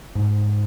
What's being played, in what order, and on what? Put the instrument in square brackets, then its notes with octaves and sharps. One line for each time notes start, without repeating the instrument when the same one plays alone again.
[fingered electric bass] G#2